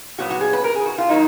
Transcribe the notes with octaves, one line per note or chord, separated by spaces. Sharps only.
A#2 F#3 B3 F#4
F#4
G#4
B4
A#4
G#4
F#4
F4
D#3 F#3 A#3 D#4